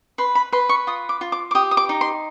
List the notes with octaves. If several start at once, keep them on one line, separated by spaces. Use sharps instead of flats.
B4 C6
B5
B4 C6
C#6
F4 D#6
D6
F4
D6
D6
G4 D#6
D#6
D6
D#4
C6